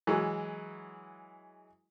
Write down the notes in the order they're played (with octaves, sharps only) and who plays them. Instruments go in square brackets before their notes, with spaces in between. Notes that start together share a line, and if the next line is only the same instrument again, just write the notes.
[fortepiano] E3 F#3 G#3